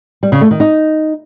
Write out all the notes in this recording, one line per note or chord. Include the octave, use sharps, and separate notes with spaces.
G3
C#3
A3
D#3
D#4